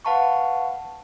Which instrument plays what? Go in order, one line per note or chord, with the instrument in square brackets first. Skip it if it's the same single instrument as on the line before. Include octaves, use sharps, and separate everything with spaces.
[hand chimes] B4 F5 F#5 A5 B5 C#6